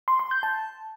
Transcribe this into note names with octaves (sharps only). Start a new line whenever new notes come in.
C6
C6
G6
A5